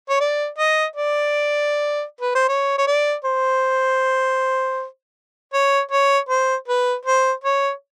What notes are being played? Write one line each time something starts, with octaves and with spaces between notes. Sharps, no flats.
C#5
D5
D#5
D5
B4
C5
C#5
C#5
D5
C5
C#5
C#5
C5
B4
C5
C#5